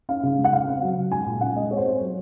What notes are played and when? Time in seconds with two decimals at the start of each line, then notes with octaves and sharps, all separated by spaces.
0.09 C#4 F5
0.23 C#3
0.38 G#3
0.44 F#5
0.53 C#3 F5
0.67 C4
0.82 F#3
0.97 C#3
1.11 G#3 G#5
1.26 A#2
1.41 C#4 F#5
1.56 G#3 D#5
1.70 C4 C#5
1.77 C5
1.85 C4 C#5
2.00 F#3